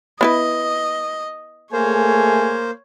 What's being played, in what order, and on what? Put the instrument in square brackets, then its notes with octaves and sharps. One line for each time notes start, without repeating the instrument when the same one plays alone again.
[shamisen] B3 E4 B4 [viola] D#5
[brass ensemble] A3 G#4 G#5 [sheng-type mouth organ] A#3 C5 [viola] C#5